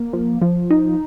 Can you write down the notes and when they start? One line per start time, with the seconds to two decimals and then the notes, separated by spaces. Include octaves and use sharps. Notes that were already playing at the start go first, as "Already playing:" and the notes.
Already playing: A#3
0.13 F3
0.42 F3
0.70 D#4